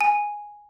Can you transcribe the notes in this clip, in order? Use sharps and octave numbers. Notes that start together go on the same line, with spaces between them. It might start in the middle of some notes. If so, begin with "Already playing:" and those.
G#5